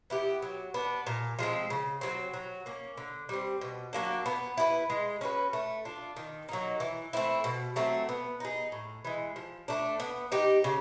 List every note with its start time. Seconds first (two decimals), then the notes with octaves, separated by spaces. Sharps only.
0.10 B3 E4 G4
0.42 F#3
0.74 B3 D4
1.07 A#2
1.39 F3 G#3 C4
1.70 C#3
2.01 F#3 A3 C4
2.34 F#3
2.66 A#3 C#4
2.97 D3
3.29 G3 C4
3.61 B2
3.93 F#3 A#3 D4
4.26 B3
4.57 E4 G4 B4
4.90 G#3
5.21 C#4 F#4 B4
5.53 A3
5.85 D4 F4
6.16 D#3
6.49 F#3 A#3 D#4
6.80 E3
7.13 A3 C4 E4
7.44 B2
7.76 F#3 A3 C4
8.09 B3
8.40 D#4 G#4
8.72 A2
9.05 E3 G#3
9.36 F3
9.68 A3 D4
10.00 B3
10.32 D#4 G4
10.64 C#3